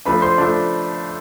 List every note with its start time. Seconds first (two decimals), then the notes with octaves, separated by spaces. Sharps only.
0.05 F3 A3 D4 B4 B5
0.22 C5 C6
0.38 F3 A3 D4